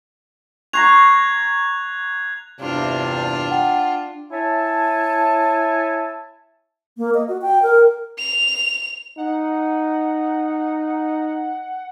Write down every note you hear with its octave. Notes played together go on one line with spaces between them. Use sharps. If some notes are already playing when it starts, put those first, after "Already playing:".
A#5 C6 C#6 F#6 G#6 F7
E2 G2 C3 D4 F4
F#5 G5
E4 C#5 E5 G#5 A5
A#3
D#5
F#4
G5
A#4
F7
D#4 F#5